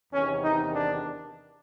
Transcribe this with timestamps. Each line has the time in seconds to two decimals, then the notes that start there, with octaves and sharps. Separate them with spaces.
0.13 E2 C3 D#3 C#4
0.44 D#4
0.74 D4